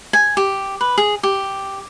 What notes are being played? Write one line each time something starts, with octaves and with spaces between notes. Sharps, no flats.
G#5
G4
B4
G#4
G4